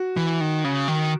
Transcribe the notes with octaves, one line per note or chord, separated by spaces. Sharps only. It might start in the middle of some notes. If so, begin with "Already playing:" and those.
Already playing: F#4
E3
D#3
C#3
D#3